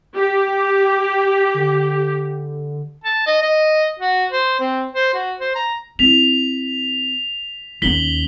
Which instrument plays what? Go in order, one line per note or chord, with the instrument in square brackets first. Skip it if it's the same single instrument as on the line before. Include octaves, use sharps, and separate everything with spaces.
[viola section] G4
[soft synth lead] D3
[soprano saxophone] A5
D#5
D#5
F#4
C5
C4
C5
F#4
C5
A#5
[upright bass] C4 E4 [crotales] B6 F7
[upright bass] D#2 C#4 [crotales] B6 F#7 G7